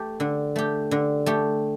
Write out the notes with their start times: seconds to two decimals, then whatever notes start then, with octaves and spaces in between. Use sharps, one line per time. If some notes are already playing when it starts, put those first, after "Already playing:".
Already playing: A3 G4
0.20 D3
0.56 A3 G4
0.91 D3
1.26 A3 G4